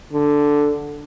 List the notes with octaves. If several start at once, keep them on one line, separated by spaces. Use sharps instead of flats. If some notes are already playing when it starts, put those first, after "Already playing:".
D3